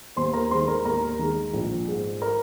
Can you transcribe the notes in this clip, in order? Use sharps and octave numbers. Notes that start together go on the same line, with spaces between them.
D#2 C5 C6
A#4 A#5
D#3 G#3 C5 C6
A#4 A#5
D#2 A#4 A#5
D#3 G#3
A#1
G#2 G#3
A#4 A#5